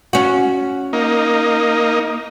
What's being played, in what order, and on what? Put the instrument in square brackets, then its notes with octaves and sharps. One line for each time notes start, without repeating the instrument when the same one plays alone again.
[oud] C#4 F#4
[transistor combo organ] A#3 D#4